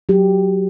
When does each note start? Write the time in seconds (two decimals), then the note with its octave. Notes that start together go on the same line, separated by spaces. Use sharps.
0.09 F#3 G4